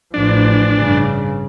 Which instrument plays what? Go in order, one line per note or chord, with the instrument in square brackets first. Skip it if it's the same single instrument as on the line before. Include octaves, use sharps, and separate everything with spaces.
[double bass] A1 F3 [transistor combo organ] D4
[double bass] G2 C#3